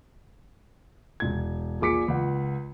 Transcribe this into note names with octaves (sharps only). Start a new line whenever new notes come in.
E1 G#6
A#1 A#2 G#4 D6 B6 C#7
C#2 F#5